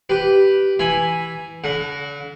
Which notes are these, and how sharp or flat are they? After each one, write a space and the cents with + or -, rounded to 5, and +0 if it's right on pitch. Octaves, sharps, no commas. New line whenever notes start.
G4 -10 B4 +0
E3 +0 G#5 +0 B5 +0
D3 -40 F#5 -5